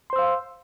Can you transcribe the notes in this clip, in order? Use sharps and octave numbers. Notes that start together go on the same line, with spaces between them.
C5 F5 C6 E6